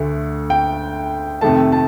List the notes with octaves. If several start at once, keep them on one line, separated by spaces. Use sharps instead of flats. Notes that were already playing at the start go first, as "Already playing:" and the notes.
Already playing: D2 D3 A3
G5
F2 C3 D#3 A3 A5
A5